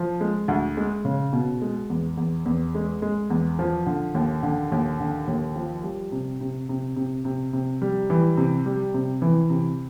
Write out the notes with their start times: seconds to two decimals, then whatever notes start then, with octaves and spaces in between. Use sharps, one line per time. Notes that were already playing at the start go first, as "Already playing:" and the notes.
Already playing: F3
0.21 G#3
0.48 D2
0.77 G#3
1.05 C#3
1.33 B2
1.62 G#3
1.90 E2
2.17 E2
2.45 E2
2.75 G#3
3.02 G#3
3.30 E2
3.59 F3
3.86 D3
4.15 D#2
4.43 D3
4.72 D#2
5.00 D3
5.28 D#2
5.56 F3
5.84 G3
6.12 C3
6.41 C3
6.69 C3
6.96 C3
7.25 C3
7.53 C3
7.82 G3
8.10 E3
8.37 C3
8.66 G3
8.94 C3
9.22 E3
9.50 C3